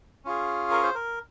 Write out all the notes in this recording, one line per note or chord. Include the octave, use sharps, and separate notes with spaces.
C#4 F4 G#4
A#4
C5
A#4